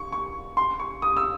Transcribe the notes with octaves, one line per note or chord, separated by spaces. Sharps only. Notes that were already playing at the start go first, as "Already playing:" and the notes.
Already playing: C#6
C#6
C6
C#6
D#6
E6